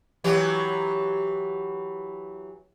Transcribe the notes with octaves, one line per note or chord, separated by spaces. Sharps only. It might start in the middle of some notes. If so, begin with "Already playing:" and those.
E3 F#3 G4